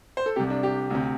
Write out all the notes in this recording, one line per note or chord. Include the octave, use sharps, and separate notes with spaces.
C5
A4
C2 C3 G4
D4
G4
D2 C3